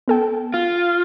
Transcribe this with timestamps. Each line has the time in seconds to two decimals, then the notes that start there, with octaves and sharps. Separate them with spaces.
0.08 B3 A4 G5
0.54 F4